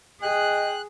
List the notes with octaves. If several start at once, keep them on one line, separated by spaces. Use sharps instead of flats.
G#4 D#5 G5 F#6